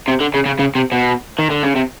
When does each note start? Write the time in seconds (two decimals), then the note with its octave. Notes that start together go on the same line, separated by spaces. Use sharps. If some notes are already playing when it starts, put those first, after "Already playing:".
0.08 C3
0.21 D3
0.34 C#3
0.46 C#3
0.59 C#3
0.75 C3
0.92 B2
1.39 D#3
1.50 D3
1.63 C#3
1.75 C3